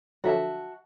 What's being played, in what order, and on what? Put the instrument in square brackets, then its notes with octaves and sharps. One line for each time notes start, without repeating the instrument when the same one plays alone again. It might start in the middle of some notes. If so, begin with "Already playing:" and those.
[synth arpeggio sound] D3 F3 F#3 [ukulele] F#4 E5 A5